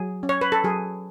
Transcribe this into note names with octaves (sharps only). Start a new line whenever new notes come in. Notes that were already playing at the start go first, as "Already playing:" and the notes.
Already playing: F#3 G#4
C#4
C#5
B4
A4
F#3 G#4